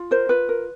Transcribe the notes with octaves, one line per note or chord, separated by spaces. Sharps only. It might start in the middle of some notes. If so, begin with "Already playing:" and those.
Already playing: F4
A#4 C5
F4 B4
A#4